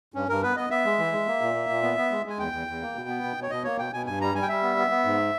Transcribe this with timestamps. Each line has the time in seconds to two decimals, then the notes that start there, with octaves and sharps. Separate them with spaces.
0.14 G2 C#4
0.29 G2 A#4
0.43 B3 B4
0.56 B3 D#5
0.70 B3 E5
0.85 G#3
0.99 E3
1.12 G#3
1.27 A#3
1.41 A#2
1.54 A#3
1.69 A#2
1.83 B3
1.97 B3
2.11 G#3
2.25 G#3 G#5
2.39 E2 G5
2.52 E2
2.67 E2
2.81 A#3
2.95 B2
3.08 B3
3.23 B2
3.37 B2
3.42 C#5
3.50 B2 D#5
3.64 A#3 C#5
3.78 B2 G5
3.93 B2 G#5
4.06 G2 G#5
4.21 G3 A#5
4.35 G3 G#5
4.42 G5
4.48 G3 E5
4.62 B3
4.77 B3
4.90 B3
5.04 G#2